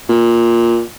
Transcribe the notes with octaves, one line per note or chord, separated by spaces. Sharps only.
A#2